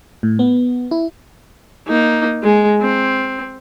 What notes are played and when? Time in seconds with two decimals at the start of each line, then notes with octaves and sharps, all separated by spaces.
0.23 A2
0.39 B3
0.91 E4
1.89 A#3 D#4
2.43 G#3
2.82 C4